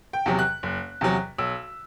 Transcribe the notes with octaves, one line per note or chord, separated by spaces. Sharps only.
G5
E2 C3 F#3
F#6
F#1
E2 C3 F#3
B1 E6